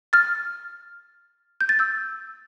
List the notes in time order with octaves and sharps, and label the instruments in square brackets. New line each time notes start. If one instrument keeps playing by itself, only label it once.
[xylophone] F6 A6
G6
A6
E6 G6